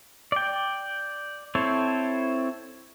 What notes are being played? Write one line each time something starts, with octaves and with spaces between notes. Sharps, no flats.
D5 G5
C4 E4 A4 C5 C#5